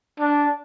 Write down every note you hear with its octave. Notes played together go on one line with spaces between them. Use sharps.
D4